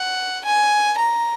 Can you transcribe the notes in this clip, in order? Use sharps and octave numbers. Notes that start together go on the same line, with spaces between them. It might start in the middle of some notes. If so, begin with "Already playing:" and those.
Already playing: F#5
G#5
A#5